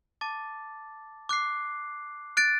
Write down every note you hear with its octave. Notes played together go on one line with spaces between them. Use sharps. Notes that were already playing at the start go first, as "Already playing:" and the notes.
A5 D6 A6
D6 F#6 C7
F#6 A6 D7